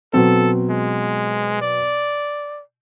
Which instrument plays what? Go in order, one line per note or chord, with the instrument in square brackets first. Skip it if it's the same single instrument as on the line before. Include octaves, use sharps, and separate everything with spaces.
[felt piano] B2 F#3 C4 [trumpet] A4
[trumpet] G#3
D5